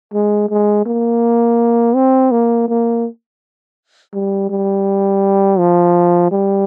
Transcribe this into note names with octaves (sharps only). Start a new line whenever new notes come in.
G#3
G#3
A#3
C4
A#3
A#3
G3
G3
F3
G3